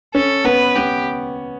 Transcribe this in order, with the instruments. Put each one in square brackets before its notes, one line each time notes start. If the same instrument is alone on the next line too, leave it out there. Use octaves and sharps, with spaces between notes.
[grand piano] C#4 [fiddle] A4
[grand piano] B3 [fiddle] B4
[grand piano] B3 [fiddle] G4